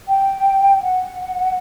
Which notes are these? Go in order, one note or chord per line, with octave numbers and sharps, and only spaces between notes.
G5
F#5